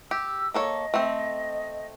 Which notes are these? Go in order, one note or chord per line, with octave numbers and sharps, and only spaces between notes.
G4 E6
A#3 A4 C#5 D#5
A3 C4